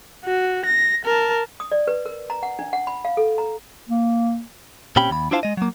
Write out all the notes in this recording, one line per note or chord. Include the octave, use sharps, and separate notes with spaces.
F#4
A#6
A#4 A5
D#6
D5
B4
A#4
A#5
F#5
D4
F#5
B5
F5
A4
A#5
A#3
A#2 C4 C#4 G4 G5 B5
D#2 B5
D4 E4 F4 C5 F5 A5
G#3 D#5
F#3 A#3